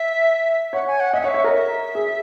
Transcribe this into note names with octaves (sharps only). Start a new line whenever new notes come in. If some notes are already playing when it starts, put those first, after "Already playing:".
Already playing: E5
C#5 F#5
G#5
F#5
D#5 E5
F#5
C#5
E5
C#5
A#4 D#5
E5
G#4